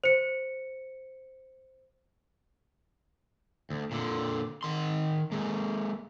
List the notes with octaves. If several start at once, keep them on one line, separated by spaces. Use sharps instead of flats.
C5 C#7
D2
A#2 D3
D#3 C6
G#3 A#3